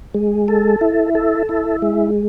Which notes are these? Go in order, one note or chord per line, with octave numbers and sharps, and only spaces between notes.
G#3
A4
E4
A4
E4
G#3